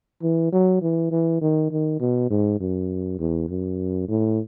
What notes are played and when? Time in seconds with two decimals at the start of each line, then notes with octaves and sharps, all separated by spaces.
0.22 E3
0.52 F#3
0.82 E3
1.11 E3
1.41 D#3
1.71 D#3
2.00 B2
2.30 G#2
2.60 F#2
3.19 E2
3.49 F#2
4.08 A2